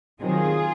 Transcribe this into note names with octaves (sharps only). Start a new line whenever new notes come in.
C3 D#3 F#3 F4 G#4